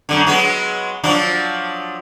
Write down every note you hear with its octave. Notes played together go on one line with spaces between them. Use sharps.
F#2 B2 D3
F#3 G#3 B3
F3 F#3 D4